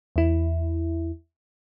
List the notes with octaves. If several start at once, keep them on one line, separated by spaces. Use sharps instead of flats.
E2 E4